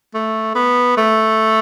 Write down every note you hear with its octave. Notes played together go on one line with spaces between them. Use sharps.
A3
B3
A3